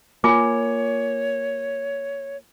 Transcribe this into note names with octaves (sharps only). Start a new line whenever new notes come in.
A#3 F4 C#5 G#5 D6